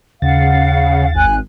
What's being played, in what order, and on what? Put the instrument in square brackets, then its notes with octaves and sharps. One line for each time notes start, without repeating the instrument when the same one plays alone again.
[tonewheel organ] D#2 A6 [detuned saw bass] C#3 [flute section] F5 F#5
[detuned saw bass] G#1 [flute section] G#5 F#6